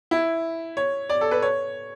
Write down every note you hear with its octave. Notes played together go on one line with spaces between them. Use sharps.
E4
C#5
D5
A4
B4
C#5